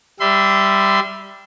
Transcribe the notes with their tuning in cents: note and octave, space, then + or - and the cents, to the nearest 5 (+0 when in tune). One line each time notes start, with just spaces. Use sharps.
G3 +0 E5 +0 C6 -35